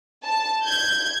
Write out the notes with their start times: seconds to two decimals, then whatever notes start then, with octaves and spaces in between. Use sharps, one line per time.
0.24 A5
0.64 G6 G#6